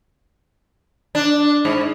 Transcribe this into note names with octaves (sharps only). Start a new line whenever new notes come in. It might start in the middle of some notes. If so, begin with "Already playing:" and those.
D4
G#2